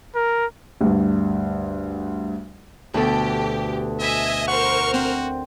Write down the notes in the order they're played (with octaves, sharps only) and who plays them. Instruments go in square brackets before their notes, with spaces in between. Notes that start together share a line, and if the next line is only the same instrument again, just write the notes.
[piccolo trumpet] A#4
[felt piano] D2 G2
[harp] D2 B2 A4 [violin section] G4
[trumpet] D#5 [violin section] E5 G#5 G#6
[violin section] A#4 C5 F6 [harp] F#5 [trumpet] C#6
[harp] C4 [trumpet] F#4